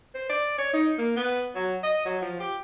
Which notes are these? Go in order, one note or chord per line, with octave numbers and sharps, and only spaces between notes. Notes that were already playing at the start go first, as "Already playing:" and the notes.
C5
D5
C#5
D#4
A#3
B3
F#3
D#5
F#3
F3
G4